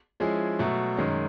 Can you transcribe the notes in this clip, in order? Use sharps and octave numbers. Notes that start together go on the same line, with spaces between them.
F3 G#3 C#4 E4 G#4
B2 F#3 A3
F#2 D#3 G#3 C#4